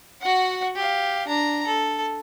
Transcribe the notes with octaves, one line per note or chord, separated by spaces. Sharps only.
F#4 F#5
G4 F5
D4 A#5
A4